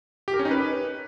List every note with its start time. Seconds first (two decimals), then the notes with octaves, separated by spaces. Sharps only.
0.28 G4
0.34 A#4
0.39 C#4
0.45 D#4
0.51 B4